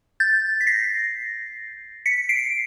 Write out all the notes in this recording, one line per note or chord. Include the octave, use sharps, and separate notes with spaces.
G6 A6
B6
A#6 C7
B6 C#7
C7 D7